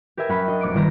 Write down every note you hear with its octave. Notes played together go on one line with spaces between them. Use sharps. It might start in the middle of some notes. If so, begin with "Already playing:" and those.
G4 A#4 B4 E5 G#5
F#2 C#4 F#5 G5 B5
D4 F#4 D#5
F1 D6 C#7 D7
G1 D#3 E5 A#5